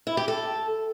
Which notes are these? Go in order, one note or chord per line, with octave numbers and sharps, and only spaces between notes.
E4
G4
A4